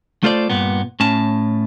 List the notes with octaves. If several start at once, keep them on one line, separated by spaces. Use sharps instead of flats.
A3 F4 A4 C5 D5
G2 A#2 B3
A2 C#4 A5